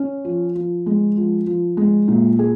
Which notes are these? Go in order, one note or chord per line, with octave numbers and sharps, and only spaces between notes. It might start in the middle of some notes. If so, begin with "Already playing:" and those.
Already playing: C#4
F3
F3
G#3
F3
F3
G#3
A#2
G#4